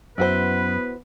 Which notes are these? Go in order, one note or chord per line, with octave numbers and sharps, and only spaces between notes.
F#2 B3 E4 F#4 B4 C5